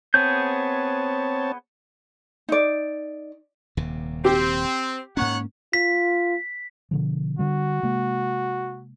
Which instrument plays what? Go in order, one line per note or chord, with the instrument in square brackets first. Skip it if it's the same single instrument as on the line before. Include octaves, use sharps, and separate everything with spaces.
[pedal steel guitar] B3 G#4 G6 [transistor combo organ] C4 C#5 A5
[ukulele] D#4 D5
[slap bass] D#1 D#2 C3
[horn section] C4 [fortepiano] G4
[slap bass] G#2 A#3 C#4 [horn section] D#3 C#5 F#5
[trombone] F4 [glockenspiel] B6
[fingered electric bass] B2 D3 F3
[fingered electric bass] D3 G3 [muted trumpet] F#4
[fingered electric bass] C3 G#3 A#3